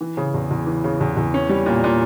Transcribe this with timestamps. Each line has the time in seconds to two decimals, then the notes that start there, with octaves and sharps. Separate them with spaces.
0.01 E3
0.17 C#3
0.34 E2
0.51 E2
0.66 E3
0.84 C#3
1.00 E2
1.17 E2
1.34 C#4
1.49 G3
1.66 A#2
1.84 A#2